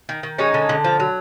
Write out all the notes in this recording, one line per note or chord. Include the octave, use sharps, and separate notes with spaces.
D#3
D#3
G#3 C#4 D#4
D3
D3
F3
F#3